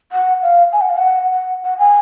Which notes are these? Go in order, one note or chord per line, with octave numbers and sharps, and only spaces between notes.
F#5
F5
G#5
F#5
F5
F#5
F#5
F#5
G#5